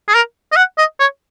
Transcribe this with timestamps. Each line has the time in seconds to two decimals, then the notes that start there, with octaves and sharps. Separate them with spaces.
0.08 G#4
0.15 A#4
0.52 D#5
0.57 F#5
0.78 D#5
1.00 C#5